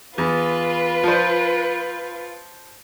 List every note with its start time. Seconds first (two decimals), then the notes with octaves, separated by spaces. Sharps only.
0.18 E2 F4 B4
1.03 F3 C5